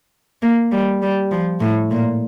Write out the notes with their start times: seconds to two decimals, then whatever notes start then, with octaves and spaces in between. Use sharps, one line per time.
0.42 A#3
0.72 G3
1.02 G3
1.31 F3
1.60 A2
1.91 A#2